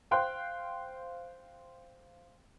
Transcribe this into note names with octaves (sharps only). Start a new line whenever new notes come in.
C5 F5 G5 C6 F#6